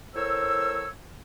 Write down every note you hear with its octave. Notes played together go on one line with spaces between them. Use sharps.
A2 A#4 C5 C#5 E6